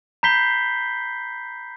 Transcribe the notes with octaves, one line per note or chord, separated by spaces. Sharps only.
A#5 B5 G6 B6 C7 G7